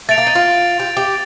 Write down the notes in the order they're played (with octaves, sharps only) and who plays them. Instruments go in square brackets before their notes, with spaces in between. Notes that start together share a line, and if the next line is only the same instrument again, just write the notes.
[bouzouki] A3 [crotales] A6 D7 F7
[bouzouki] A#3
D#4
F4
G4
G4